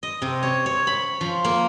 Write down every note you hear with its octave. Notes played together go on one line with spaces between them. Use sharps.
D#5
C3
C#5
C#5
B5
F3
A#3